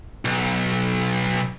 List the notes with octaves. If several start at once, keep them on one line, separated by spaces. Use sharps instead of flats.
B1